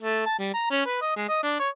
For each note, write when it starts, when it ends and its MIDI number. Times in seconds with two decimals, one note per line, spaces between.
0.01 0.23 57
0.26 0.37 81
0.39 0.51 55
0.54 0.66 82
0.70 0.83 61
0.85 1.00 71
1.01 1.15 75
1.16 1.25 56
1.28 1.42 75
1.43 1.59 62
1.59 1.69 73